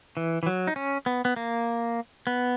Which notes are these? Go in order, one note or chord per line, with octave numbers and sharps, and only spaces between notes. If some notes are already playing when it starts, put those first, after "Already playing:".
E3
E3
F#3
D#4
C#4
B3
B3
A#3
B3